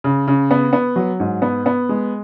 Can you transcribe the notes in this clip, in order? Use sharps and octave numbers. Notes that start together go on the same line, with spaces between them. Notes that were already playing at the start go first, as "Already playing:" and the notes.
C#3
C#3
B3
B3
F#3
G#2
B3
B3
G#3